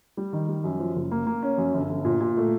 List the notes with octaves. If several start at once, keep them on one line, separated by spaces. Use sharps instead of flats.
G3
D#3
G3
F#2
F3
F#1
A#3
A#3
C#4
F#2
G1
G1
A#2
A#2
A3